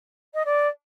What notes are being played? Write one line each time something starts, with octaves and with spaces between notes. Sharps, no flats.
D#5
D5